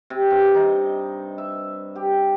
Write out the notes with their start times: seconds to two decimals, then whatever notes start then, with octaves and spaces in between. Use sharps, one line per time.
0.10 C3
0.30 G2
0.54 D#4
1.38 E5
1.95 G4